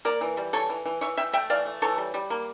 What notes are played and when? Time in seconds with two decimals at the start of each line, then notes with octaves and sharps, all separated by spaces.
0.05 A#3 A#4 D5
0.21 E3
0.37 G3
0.53 E3 A4 C#5
0.70 E3
0.86 E3
1.01 E3 C#5 E5
1.17 E3 E5 G5
1.33 A3 E5 G5
1.50 E3 D5 F5
1.65 A3
1.82 E3 A4 C#5
1.98 G3
2.14 G3
2.30 A#3